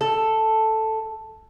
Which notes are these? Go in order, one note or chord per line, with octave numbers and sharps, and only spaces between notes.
A4